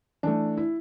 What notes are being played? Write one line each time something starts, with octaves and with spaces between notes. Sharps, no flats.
E3 A3 D4
E4